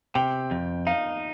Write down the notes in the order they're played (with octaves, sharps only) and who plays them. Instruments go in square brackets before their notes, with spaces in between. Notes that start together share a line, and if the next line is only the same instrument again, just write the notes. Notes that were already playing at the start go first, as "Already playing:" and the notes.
[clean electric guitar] C3 [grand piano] G5
[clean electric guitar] F2
[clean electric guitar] D#4 [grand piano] F5